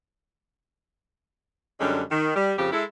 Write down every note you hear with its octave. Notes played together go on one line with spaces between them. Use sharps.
F#2 D3 G3 G#3 C#4 D4
D#3
G3
F2 C#3 F3 G4
G#3 E4 A4